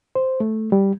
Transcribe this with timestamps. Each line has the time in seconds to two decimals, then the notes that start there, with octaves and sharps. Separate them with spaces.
0.15 C5
0.40 A3
0.72 G3